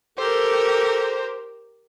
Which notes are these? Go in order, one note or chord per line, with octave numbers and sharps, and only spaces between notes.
G4 A4 A#4 C5